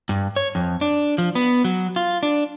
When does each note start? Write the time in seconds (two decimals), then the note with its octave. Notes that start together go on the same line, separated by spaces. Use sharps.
0.09 G2
0.36 C#5
0.55 F2
0.81 D4
1.18 F3
1.35 B3
1.65 F#3
1.96 F4
2.23 D4